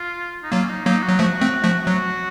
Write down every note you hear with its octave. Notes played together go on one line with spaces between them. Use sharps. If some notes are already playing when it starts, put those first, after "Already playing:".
Already playing: F4
D#4
F#3 A#3 F4
C#4
D#4
F#3 A#3 D#4
F#4
F#3
F3 A3 F#4
A3 C4
F3 A3
F#3 F#4